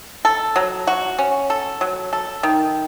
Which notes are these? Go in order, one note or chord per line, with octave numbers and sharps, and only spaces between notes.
A4
F#3
F#4
C#4
A4
F#3
A4
D#3